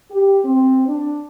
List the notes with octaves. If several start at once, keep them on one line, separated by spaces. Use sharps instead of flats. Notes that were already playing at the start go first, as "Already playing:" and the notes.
G4
C4
D4